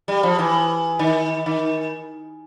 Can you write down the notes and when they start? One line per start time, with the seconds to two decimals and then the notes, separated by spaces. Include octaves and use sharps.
0.08 G3
0.23 F3
0.38 E3
0.99 D#3
1.46 D#3